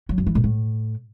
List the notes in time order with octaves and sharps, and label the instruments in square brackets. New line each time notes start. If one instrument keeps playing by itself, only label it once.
[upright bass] F#3
F#2
E3
A#2
A2